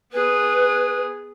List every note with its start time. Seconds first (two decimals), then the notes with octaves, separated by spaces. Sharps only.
0.13 B3 G#4 B4